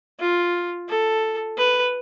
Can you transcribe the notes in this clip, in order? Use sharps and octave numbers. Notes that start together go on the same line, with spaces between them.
F4
A4
B4